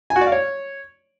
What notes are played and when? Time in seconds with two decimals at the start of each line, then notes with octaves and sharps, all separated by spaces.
0.10 G#5
0.16 F#4
0.21 D5
0.27 F5
0.32 C#5